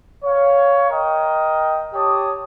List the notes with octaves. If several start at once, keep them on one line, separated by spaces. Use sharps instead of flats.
C#5 F5
A#4 D#5 G5
G4 C#5 A5 D#6